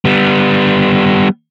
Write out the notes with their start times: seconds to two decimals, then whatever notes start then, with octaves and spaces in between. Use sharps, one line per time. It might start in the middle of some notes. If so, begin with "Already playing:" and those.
0.05 G3 B3